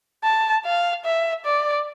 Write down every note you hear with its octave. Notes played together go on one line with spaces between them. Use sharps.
A5
F5
E5
D5